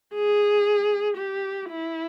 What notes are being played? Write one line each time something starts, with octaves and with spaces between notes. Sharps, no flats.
G#4
G4
E4